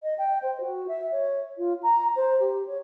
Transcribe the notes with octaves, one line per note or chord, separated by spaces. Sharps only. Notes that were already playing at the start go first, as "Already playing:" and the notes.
D#5
G5
C5
F#4
E5
C#5
F4
A#5
C5
G4
C#5